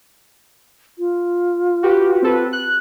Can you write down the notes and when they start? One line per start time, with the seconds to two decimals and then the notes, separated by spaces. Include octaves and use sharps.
0.98 F4
1.83 F#4 G4 B4
2.22 C4 A4 B4
2.53 F#6